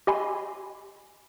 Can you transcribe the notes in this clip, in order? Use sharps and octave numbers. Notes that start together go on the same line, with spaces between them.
G4 D#5 G#5 B5 C6